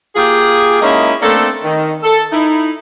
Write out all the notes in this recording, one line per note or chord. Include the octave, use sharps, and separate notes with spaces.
A#3 F4 G4 G#4
G#3 A#3 C#4 D#4 E4 G#4
A3 A#3 C4 D4 A4
D#3
A4
D#4 E4